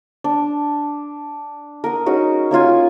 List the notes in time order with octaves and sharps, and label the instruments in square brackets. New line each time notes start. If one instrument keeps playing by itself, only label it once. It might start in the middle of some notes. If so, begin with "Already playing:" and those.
[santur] D4
A#4 F#5 D#6
C#4 D#4 F#4 G#4
A#3 C#4 F4 G#5